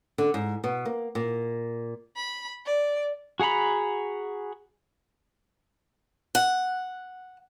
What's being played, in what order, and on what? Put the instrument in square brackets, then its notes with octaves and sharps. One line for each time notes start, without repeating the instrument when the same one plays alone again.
[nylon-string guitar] D3
G#2
B2
A#3
A#2
[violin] B5
D5
[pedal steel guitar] F#4 G#4 F#5 A#5 B5
[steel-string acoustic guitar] F#5